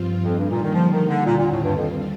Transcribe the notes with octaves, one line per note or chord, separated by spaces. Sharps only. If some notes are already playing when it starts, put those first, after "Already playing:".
Already playing: G2 F3 C4 F4
F2 D3 G3 A#3 D#4
G2
A#2
D#3
F3
D#3
D3
D#2 A#2 D3 G3 C4 F4
A#2
A2
G2
F2